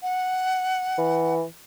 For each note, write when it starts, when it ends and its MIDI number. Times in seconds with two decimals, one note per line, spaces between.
0.02 1.35 78
0.98 1.44 52